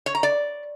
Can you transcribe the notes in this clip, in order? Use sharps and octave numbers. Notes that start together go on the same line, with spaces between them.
C#5
A#5
D5